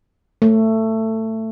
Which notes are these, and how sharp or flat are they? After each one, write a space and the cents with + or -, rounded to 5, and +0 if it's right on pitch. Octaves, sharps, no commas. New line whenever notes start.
A3 +15